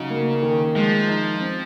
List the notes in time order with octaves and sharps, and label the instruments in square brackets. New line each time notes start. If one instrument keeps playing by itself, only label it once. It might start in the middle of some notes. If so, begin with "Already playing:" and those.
Already playing: [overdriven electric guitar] C#3 [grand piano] F#3 D#4
[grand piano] A#3
D#3
[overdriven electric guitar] F3 [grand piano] G#3
[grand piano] D#4
C4